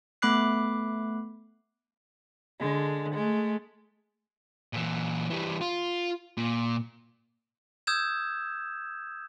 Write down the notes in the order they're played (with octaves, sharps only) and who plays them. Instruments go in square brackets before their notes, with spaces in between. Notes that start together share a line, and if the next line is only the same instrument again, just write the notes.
[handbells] A3 B3 B5 D6 F#6 C7
[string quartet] D3 G#3
G#3 A3
[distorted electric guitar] A#2 E3
E3 G3
F4
A#2
[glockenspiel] D#6 E6 G6 G#6 E7